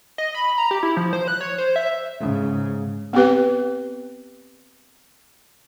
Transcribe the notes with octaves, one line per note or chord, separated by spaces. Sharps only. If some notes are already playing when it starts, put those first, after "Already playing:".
D#5
B5
A#5
G4
E4
F3
C5
F#6
C#5
C5
E5
G#2 C#3
B3 C4 G4 B4